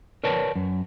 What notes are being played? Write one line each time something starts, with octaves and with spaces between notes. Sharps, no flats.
A#4 B4 C#5 D5 A5
F#2